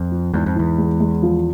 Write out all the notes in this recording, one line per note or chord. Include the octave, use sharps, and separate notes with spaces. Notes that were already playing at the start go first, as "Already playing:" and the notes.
Already playing: F2
F3
E2 G#2
F2
E2 E3
G#3
G#3
F3